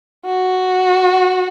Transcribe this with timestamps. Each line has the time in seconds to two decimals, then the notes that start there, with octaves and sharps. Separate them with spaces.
0.25 F#4